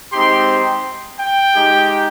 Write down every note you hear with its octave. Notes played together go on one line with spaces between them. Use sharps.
G#3 C4 D#4 G4 C6
G5
G#3 D#4 G4